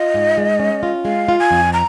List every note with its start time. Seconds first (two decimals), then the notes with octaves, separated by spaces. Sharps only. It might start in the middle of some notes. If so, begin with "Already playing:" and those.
Already playing: F4 D#5
0.14 G#2
0.38 G#3
0.59 C#4
0.83 F4
1.05 G#3 F5
1.29 F4
1.39 G#5
1.51 F2
1.73 A#5